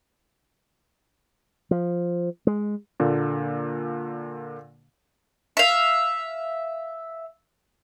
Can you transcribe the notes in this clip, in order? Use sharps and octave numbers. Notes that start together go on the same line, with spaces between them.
F3
G#3
A#2 D3 A#3
E5 F5